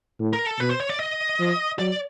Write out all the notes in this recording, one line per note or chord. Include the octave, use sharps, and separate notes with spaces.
A2
A#4
A4
B2 B4
C5
C#5
D5
D#5
F3
F#3 D5